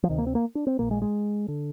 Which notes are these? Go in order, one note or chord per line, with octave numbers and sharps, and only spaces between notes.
F3
D2 C3 D#3
A#3
C4
A#3
D4
C4
A#1 A#2 A#3
G#3
G#3
D3